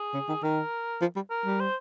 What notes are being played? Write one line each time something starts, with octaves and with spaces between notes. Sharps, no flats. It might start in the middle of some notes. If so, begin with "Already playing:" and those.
Already playing: G#4
C#3
D#3
D#3 A#4
F3
G3
A#4
G3
C5